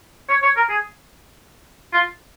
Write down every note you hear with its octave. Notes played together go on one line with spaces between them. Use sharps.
C#5
C#5
A#4
G#4
F4